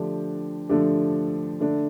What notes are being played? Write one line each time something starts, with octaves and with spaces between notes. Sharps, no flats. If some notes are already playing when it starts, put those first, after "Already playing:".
Already playing: D3 F3 A3 D4 G4
D3 F3 A3 D4 G4
D3 A3 D4